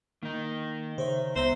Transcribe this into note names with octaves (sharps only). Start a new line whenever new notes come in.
D#3 A#3 D#4
C#3 C5 C#5 E5
C#2 B3 C5 E5 A#5